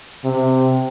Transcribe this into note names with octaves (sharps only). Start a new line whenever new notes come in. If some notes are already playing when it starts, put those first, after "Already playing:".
C3